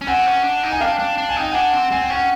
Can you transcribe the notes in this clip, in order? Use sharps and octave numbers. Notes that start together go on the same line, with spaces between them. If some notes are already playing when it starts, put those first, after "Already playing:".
C#4
C4 F#5 G#5
C#4
D4
D#4
G#5
D4 F5 G5
D4
D4
G#5
D#4 G5
D4 F#5 G#5
C4
C4 G#5
G5
C#4 F#5